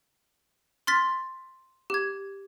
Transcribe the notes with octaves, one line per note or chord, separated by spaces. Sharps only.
C6 F6 A6 B6
G4 G#6